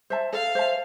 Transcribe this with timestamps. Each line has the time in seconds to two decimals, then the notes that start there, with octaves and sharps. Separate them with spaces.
0.10 C5 E5 A5
0.33 A4 F5
0.55 C5 E5 A5